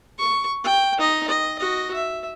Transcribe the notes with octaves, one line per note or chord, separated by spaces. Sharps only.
C#6
G5
D#4 D#5
D#5
F#4 D#5
E5